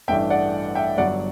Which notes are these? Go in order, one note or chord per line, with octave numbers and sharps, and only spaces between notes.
A1 G2 E3 A3 D4 E5 G5
D5 F#5
E5 G5
G1 G2 F#3 D5 F#5